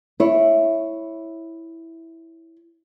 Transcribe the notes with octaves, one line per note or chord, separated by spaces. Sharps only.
E4 C#5